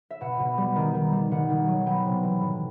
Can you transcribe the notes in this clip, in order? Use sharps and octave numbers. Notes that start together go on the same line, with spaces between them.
E5
B2 F#5
B2
G3
D#3
D#3
G3
D#3 F#5
D#3
F#3
B3 G5
C3
E3
A2